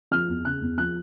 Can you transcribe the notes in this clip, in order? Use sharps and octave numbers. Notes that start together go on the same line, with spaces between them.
F3 F6
E2
C#3 F#6
E2
F3 F#6